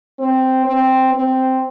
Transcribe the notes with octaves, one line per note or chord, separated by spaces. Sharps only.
C4
C4
C4